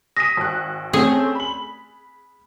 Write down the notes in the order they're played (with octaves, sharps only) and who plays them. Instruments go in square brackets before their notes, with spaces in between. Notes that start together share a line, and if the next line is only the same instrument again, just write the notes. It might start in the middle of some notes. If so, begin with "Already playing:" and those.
[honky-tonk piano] D#6 B6 D#7 [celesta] A#6
[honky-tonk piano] G#1 F#6
[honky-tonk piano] A3 C4 C#4 [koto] G#4
[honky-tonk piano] B5 F#7